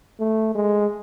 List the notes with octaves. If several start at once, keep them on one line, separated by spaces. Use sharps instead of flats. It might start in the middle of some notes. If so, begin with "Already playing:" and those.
A3
G#3